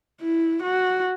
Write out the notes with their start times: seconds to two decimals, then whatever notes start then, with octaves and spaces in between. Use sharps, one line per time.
0.22 E4
0.62 F#4